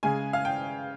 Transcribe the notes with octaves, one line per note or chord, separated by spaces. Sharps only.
C#3 G#3 G#5
F5
G5